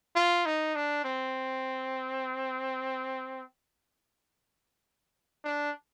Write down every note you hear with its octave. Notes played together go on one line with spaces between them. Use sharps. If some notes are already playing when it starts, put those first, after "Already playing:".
F4
D#4
D4
C4
D4